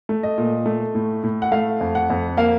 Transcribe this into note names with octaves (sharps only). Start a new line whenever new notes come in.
A3
D#5
A#2
A3
A2
A2
F#5
A3 F5
F2
F#5
F2
A#3 F5